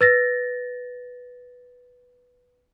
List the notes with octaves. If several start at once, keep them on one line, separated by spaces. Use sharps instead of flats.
B4 A6 A#6